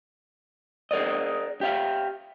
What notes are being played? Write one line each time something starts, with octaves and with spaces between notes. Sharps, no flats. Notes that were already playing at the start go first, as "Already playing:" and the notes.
G#4 A#4 D5 D#5
G4 E5 F5